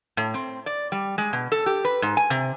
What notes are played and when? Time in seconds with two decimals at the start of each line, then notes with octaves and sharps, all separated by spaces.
0.17 A2
0.34 C4
0.66 D5
0.92 G3
1.18 G#3
1.33 B2
1.52 A4
1.66 G4
1.85 B4
2.02 G#2
2.17 G#5
2.30 C3